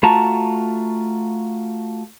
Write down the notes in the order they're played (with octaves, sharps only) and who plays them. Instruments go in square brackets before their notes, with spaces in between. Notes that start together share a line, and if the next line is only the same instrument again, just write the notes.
[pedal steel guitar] A3 F4 F#4 A5 A#5